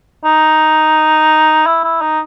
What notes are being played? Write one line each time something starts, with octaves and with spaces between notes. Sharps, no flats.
D#4
E4
E4
D#4